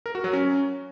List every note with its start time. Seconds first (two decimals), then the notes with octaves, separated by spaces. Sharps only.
0.06 A#4
0.15 F#4
0.24 F#3
0.33 C#4